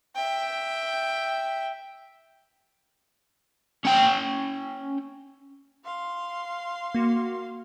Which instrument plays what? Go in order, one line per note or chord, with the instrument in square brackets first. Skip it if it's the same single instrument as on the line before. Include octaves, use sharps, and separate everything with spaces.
[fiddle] E5 G5
[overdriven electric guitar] C#4 G5
[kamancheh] F5 C6
[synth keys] A#3 F#4